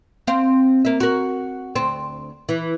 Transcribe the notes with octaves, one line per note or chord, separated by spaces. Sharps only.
C4 F5
A#3 E5
F#4 A#4
D2 C4
E3